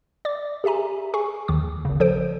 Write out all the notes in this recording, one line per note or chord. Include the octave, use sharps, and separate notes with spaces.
D5 D6
G4 G#4 E5 G#5 A#5
G#4 G#5 C#6
D#2 D#3 D6
G#1 C#3
F3 A4 C5 D7